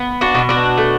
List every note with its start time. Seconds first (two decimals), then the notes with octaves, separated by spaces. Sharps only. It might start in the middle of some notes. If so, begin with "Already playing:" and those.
Already playing: B3
0.21 D4 F#4
0.35 B2
0.49 D4 F#4
0.78 A3